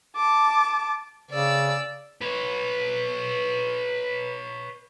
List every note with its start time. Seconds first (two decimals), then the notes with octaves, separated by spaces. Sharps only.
0.16 A5 D6
1.31 C#3 D5 E6
2.21 B4 C#5